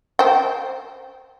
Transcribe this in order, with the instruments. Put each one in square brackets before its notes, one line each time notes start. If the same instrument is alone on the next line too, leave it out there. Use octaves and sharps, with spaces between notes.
[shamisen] C5 G5